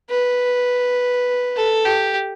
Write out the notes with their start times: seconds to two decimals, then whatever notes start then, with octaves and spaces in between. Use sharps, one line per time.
0.10 B4
1.57 A4
1.85 G4